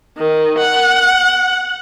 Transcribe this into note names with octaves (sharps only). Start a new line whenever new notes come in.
D#3
F#5